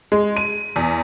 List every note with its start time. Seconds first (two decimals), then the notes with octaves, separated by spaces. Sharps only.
0.12 G#3
0.37 D#7
0.76 E2